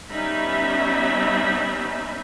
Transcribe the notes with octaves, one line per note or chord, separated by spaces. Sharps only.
G3 B3 C#4 D#4 E5 B5